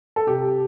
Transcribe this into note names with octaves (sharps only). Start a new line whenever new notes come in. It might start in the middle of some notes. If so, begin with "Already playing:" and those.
A4
C3 G4